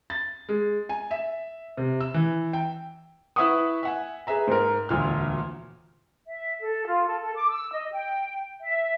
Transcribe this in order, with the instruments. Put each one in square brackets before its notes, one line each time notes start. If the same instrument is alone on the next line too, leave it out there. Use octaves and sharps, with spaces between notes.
[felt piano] A6
G#3
G#5
E5
C3
E6
E3
G5
E4 B4 E5 F#5 C#6 D#6
E5 F#5 G#5
G#4 B4 E5 A#5
G#2 A#4
E1 D2 A#2 F6
[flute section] E5
A4
F4
A4
A4
D6
E6
D#5
G5
E5